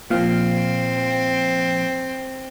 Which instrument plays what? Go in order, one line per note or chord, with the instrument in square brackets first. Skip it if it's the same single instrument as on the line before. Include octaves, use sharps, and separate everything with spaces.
[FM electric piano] A#2 F3 F5 [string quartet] C4